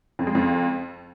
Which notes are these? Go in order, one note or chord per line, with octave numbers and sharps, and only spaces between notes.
F2
G#3
F2